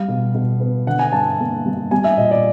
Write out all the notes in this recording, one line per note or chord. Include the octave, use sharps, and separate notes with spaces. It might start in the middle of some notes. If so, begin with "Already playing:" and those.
Already playing: G3 F5
B2
B2
B3
D3 F#5
G#5
G2 A5
A#3
G3
G3 G#5
E5
A#2 D#5
D5